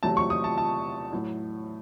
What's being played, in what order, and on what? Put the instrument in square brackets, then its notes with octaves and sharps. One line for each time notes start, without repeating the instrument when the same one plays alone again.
[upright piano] E2 C3 F#3 A3 A5
C#6
D#6
A5
A5
A2 F#3 A3